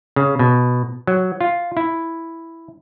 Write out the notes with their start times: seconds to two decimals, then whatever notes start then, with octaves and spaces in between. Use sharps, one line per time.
0.16 C#3
0.39 B2
1.07 F#3
1.41 F4
1.77 E4